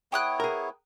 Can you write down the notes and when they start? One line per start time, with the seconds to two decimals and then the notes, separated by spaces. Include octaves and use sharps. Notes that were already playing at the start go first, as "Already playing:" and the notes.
0.12 B3 E4 C#5 G5 D#6 F#6
0.40 G#4 A#4